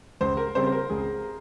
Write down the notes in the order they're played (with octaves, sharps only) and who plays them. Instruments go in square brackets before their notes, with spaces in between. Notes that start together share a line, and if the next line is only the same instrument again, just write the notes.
[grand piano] C#2 [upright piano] C5
[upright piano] A#4
[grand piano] C#3 G3 C4 [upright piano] C5
[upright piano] C5
A#4
[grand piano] C#2 [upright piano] G#4